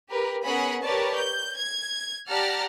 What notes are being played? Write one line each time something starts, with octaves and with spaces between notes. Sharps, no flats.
G4 A#4 B4
B3 C#4 G#4 A#4 F#5 B5
G4 A#4 B4 C#5 D5 A5
G6
G#6
G4 D5 F#5 A5 A#5 F6